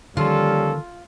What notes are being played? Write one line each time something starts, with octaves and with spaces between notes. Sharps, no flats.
D3 D#3 F3 G3 A#3 C#4 F4 A4